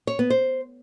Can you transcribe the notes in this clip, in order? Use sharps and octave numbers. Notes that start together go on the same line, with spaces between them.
C#5
B3
C5